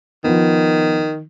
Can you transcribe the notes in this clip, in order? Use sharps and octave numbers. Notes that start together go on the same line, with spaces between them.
D#3 F3 B3